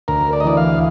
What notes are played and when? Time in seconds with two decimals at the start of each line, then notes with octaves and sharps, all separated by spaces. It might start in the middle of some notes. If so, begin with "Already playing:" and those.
0.08 D2 A#4
0.33 D5
0.40 D#5
0.45 E3 D5
0.57 F5